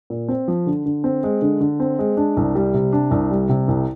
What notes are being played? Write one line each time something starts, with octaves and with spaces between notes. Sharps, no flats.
A#2
C4
F3
D3
D3
C4
G#3
D3
D3
C4
G#3
D4
C2
G3
C3
D4
C2
G3
C3
C2